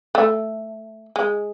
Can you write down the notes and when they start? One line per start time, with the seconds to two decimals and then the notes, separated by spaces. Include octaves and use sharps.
0.15 A3
1.16 G#3